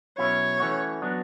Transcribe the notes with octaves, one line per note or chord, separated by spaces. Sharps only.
B2 F#3 C#4 E4 C#5
E3 A3 C#4 F#4
F#3 B3 D4